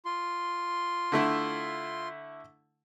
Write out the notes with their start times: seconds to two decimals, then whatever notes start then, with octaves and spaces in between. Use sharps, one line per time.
0.05 F4 C6
1.12 D3 A3 E4